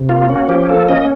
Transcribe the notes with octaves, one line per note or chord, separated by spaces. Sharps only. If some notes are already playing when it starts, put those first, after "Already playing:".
Already playing: C3
A#3 F4
C#4 F#4
F3 G4
A#3 A4
C#4 D#5